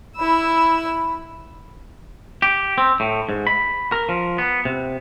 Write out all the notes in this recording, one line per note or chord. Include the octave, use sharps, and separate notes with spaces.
E4 B5 E6
G4
C4
A2
G#2
B5
A#4
F3
B3
C3